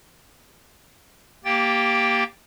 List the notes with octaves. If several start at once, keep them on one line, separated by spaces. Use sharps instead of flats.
A#3 G4 G5 A6